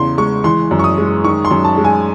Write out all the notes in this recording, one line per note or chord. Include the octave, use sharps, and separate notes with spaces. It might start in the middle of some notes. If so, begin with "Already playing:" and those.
Already playing: E2 C#3 C6
G#3 C#6
E3 C6
F#2
C#6
D#6
G#3
D#3 C#6
C6
F#2
A5
G#3
G#5